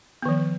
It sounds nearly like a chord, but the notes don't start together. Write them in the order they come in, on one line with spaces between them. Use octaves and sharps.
B3 D#3 F3